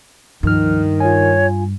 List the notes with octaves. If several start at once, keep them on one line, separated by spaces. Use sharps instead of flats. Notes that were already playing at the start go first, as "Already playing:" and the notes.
C#2 G2 D#3 F3 F6
F4 C#5 G#5